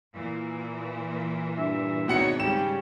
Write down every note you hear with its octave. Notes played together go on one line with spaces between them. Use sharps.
A#2 E3
G2 E5
G#1 B2 D#4 C#5 D5 F#5 C#7
G#2 C#3 G3 C#4 G5 E7